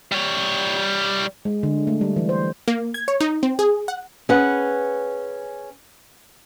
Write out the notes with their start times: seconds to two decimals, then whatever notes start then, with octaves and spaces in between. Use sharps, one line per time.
0.12 G3 C#5
1.45 G#3
1.63 D3
1.87 A3
2.01 G3
2.16 E3
2.29 C5
2.68 A#3
2.94 G#6
3.08 C#5
3.20 D#4
3.43 C4
3.59 G#4
3.88 F#5
4.29 C#4 G#4 B4 F#5